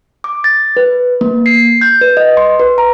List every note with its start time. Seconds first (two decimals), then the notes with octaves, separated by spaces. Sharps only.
0.24 D6
0.44 A6
0.77 B4
1.21 A#3
1.46 C7
1.81 G6
2.01 B4
2.17 D#5
2.37 C6
2.60 B4
2.78 A#5